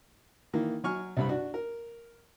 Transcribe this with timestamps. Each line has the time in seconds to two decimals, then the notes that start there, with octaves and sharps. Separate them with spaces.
0.53 D#3 E3 A#3
0.84 F#3 G#5 C#6 F6
1.17 C2 G2 B5
1.29 D4 F#4
1.54 A#4